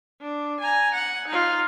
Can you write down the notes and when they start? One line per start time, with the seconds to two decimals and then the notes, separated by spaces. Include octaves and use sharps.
0.21 D4
0.60 G#5 A#5
0.95 F#5
1.28 D#4 F4